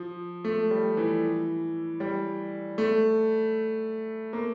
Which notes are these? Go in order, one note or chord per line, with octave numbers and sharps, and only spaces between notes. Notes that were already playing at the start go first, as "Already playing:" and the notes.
Already playing: F3
A3
G3
E3
G3
A3
A#3